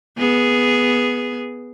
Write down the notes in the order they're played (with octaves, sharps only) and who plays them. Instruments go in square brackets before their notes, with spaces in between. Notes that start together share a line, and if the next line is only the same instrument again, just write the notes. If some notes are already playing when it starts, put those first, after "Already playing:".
[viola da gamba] B3 G#4